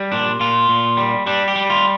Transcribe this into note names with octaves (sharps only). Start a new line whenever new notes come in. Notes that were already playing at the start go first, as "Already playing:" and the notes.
Already playing: G3
A#2 D4
A#2 F4
A#2
G3
G3 D4
G4
G3
F4